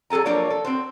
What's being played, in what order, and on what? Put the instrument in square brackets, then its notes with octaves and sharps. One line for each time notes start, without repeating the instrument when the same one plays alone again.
[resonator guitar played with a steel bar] F#3 G#4 A4 G#5 A#5
F3 F#3 A#3 D4 A#4 C#5
A4
C4 F#4 C5